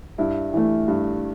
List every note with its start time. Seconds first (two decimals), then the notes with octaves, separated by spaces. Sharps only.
0.18 G2 E4
0.53 E3 A3
0.88 G2